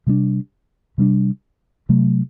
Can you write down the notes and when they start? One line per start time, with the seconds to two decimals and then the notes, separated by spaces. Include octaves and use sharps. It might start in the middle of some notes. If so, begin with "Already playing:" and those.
0.07 C3 G3 B3 D4
0.98 C3 G3 B3 D4
1.89 C3 F#3 A3